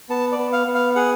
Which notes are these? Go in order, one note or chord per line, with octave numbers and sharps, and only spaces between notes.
B3 A5
D5
B3
F5
B3
F5
G#4 F#5